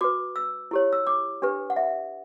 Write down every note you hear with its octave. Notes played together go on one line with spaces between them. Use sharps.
F#4 B4 D6
E6
E4 G4 C#5
E6
D6
D4 G4 B4
F#5
E5